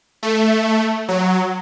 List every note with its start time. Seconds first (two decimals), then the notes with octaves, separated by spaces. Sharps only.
0.23 A3
1.08 F#3